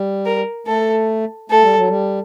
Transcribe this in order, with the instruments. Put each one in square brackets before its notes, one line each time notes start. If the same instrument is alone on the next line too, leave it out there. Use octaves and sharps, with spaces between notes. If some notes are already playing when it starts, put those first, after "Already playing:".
Already playing: [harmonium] G3
[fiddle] A#4
[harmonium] A3 [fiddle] A4
[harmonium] A3 [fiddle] A4
[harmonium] G3
F#3
G3